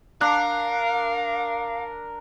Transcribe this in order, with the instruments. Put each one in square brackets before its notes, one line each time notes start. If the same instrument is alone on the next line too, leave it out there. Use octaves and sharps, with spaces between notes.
[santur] D4 [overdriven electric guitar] A#4 [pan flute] F5 [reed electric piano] F#6